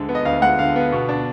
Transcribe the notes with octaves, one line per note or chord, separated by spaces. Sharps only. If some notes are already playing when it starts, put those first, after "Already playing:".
Already playing: D2 D3 G#3
B3
D#5
D2 F5
G#3 F#5
D3 F5
B3
B2
D4